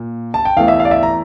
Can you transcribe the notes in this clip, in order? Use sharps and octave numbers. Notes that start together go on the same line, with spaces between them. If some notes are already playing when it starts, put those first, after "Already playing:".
Already playing: A#2
A5
G5
E2 E3 A3 F5
E5
F5
D5
E5
A#5